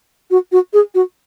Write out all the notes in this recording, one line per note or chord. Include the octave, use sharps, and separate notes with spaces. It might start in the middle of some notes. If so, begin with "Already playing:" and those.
F#4
F#4
G#4
F#4